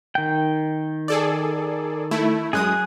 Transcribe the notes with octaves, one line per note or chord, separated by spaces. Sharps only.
D#3 G5
G#4 A4 D5
A3 E4
F#2 G#3 G#4 D#6 F#6